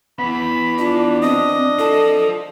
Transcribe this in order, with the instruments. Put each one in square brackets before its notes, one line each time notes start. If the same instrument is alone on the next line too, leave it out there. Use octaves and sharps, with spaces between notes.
[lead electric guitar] E3 B3 [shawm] B5
[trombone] D4 [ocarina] F4
[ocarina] C4 [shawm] D#5
[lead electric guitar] F4 A5 [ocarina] A4